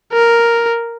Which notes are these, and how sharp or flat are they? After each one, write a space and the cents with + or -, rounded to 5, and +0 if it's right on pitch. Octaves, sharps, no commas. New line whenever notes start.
A#4 +0